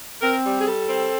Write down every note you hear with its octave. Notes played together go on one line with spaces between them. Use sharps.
C4 A#4
G3
G#4
G3 A4
C4